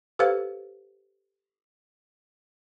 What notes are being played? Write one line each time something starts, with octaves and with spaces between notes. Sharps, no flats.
G4 A4 B4 C5 F5